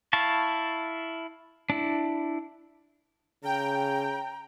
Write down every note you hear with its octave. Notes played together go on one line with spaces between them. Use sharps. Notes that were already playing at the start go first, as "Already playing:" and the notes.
E4 F5 A5 C#6
D4 E4
C#3 G5 A#5